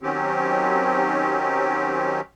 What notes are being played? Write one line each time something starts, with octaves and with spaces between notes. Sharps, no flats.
D#3 F#3 C4 C#4 G4